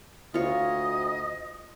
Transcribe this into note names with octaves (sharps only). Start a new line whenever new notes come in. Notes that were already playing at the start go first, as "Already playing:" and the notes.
D2 F4 C#5 D#5